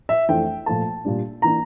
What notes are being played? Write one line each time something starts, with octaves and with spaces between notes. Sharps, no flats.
E5
F2 E3 A3 D4 G5
A#2 F3 A3 A5
A#2 G3 D4
E3 A#3 D4 A#5